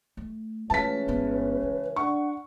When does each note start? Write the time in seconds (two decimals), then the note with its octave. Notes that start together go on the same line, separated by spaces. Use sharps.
0.17 A3
0.70 E3 G#3 A3 C#4 F4 B4 A5 B6
1.08 G1 B3
1.63 C#3
1.96 D4 F#5 C#6